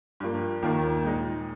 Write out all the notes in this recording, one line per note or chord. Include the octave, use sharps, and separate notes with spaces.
G2 F3 A#3
D#2 D#3 A#3 F4
A#2 G#3 D#4